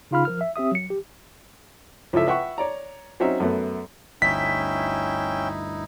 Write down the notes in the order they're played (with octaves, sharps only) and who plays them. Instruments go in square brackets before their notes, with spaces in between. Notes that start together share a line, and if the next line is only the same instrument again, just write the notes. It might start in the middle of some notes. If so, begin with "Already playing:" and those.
[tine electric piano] C#3 D#4 F4 F5 B5 F6
F3 A#4 F6
E5
C4 G4 E5 D#6
F#3 C#7
G4
[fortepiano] C#2 F3 E4 A4 E5
B4 E5 F#5 G5 C#6
C#5 D5 A#5
F#3 C4 C#4 D#4 F#4 E5
F#2 A3 B3
[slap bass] G1 D2 [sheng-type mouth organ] C#4 E5 G5 [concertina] D#4 E4 [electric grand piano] B6